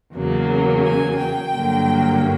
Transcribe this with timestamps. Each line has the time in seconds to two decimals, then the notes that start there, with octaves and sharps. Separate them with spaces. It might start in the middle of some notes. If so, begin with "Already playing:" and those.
0.15 E2 C#3 F#3 A#3
0.84 G#5
1.18 G5
1.53 G2 D3 F#3 A#3